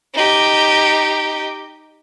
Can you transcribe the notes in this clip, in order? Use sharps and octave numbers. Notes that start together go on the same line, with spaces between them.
D#4 G4